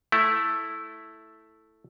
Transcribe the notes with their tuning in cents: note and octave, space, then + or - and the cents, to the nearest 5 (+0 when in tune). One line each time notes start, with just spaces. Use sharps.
A3 +0 E4 +0